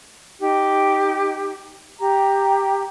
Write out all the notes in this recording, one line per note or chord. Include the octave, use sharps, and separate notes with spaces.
D#4 G4
G4 A#5